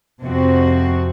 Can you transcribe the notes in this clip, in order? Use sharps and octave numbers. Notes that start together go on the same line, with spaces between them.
F2 C3 F3 C4 F#4